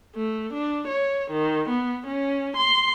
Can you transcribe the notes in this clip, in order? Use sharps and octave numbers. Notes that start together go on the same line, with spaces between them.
A3
D4
C#5
D#3
B3
C#4
C6